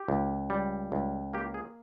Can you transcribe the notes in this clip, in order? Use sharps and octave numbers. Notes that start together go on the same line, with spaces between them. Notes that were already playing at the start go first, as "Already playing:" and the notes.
Already playing: G4
C#2
G3
C#2
A#3 G4
G#4